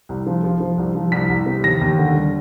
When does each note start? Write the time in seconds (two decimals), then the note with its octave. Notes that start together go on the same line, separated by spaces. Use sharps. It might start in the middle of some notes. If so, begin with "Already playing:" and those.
0.09 C2
0.27 F3
0.44 F3
0.60 F3
0.78 C2
0.95 F3
1.12 C2 B6
1.29 C2
1.46 C3
1.64 D#2 A#6
1.81 D#2
1.98 D3
2.16 G3